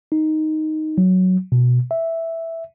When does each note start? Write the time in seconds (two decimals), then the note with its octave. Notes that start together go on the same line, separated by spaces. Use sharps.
0.12 D#4
0.98 F#3
1.52 B2
1.91 E5